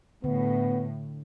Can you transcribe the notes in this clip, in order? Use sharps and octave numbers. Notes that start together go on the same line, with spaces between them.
A2 D3 B3